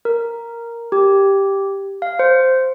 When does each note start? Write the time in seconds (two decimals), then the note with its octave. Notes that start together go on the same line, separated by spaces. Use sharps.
0.05 A#4
0.92 G4
2.02 F5
2.19 C5